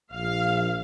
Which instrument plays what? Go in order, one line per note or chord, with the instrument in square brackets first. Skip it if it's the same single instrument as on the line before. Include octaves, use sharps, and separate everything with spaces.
[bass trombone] A#1 [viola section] F5